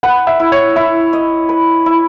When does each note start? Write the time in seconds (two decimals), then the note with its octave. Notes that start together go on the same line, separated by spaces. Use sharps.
0.03 B4 F#5
0.27 E5
0.40 E4
0.52 C#5
0.76 E4 E5
1.13 D#5
1.49 B4
1.86 E4